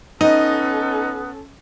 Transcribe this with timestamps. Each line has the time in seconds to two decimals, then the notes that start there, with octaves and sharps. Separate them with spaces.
0.21 B3 C#4 D#4 A4 D#5